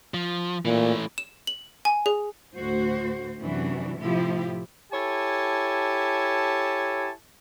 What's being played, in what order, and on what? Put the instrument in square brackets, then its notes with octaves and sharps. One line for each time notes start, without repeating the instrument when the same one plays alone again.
[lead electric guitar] F3
[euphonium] A#2 [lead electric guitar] E3 A3
[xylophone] E7
F#7
G#5
G#4
[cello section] D2 A2 F#4 C5
F#2 C3 E3 D4 F#4
A2 C3 F3 E4 F4 G4
[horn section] E4 G4 A4 C#5 G#5 A5